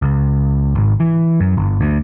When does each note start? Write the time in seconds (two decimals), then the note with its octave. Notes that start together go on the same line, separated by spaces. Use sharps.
0.02 C#2
0.75 G#1
1.00 E3
1.40 F#2
1.57 G1
1.81 D2